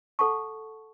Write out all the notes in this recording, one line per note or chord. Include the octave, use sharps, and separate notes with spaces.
A4 F#5 A5 C#6